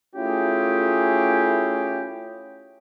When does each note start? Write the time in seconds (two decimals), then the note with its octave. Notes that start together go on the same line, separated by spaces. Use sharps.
0.15 A3 C#4 E4 F4 G4 G#4